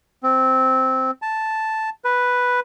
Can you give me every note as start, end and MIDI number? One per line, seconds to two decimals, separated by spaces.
0.23 1.11 60
1.22 1.90 81
2.04 2.60 71